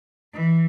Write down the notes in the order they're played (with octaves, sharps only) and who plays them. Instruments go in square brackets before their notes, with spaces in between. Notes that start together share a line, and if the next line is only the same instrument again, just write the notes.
[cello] E3